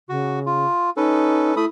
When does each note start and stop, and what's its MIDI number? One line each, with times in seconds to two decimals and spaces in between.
0.09 0.66 49
0.09 0.39 66
0.46 0.90 65
0.97 1.55 61
0.97 1.55 63
0.97 1.55 69
0.97 1.55 71
1.57 1.65 57
1.57 1.67 64
1.57 1.65 83
1.57 1.65 87